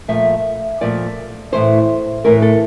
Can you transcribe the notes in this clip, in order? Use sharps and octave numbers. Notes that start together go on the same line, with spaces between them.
A#2 F3 A3 E5
A#2 F3 A3 D5
A2 E3 A3 C5
A2 E3 A3 A#4
A4